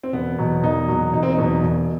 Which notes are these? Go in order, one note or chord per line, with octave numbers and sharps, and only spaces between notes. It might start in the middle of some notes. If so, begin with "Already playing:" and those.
C4
E1 B3
E2 B2 F#3
E1 D#4
E2 B2 F#3
E1 D#4
C4
D#4
E2 B2 F#3
E1